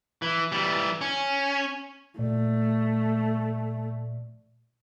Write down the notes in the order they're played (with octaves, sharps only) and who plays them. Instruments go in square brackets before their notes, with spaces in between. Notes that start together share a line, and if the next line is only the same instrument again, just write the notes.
[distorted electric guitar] E3
E3 G3
C#4
[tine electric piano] A#2 D5 [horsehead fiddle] A3